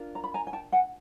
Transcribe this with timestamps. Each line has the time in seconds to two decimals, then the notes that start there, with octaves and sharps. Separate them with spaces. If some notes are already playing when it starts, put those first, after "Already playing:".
Already playing: D4 F4 A#4
0.15 A#5
0.24 B5
0.34 G#5 A#5
0.47 G#5
0.53 G5 A5
0.72 F#5 G#5